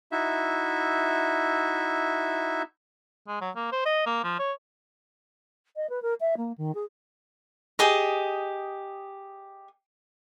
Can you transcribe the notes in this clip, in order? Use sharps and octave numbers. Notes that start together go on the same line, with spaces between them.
D#4 E4 F#4 E5
G#3
F#3
A#3
C5
D#5
A#3
F3
C#5
D#5
B4
A#4
E5
A#3
D#3
G#4
G4 G#4 D#5